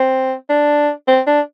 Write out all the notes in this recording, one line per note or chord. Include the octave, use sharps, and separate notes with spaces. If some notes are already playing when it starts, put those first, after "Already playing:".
Already playing: C4
D4
C4
D4